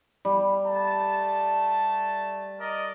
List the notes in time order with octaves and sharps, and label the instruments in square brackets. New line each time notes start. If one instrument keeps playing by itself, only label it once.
[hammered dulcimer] G3
[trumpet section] A3 A5
A#4 D5 D#5